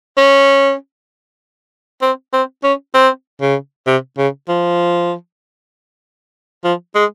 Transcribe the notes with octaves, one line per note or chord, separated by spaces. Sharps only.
C#4
C4
C4
C#4
C4
C#3
C3
C#3
F3
F3
G#3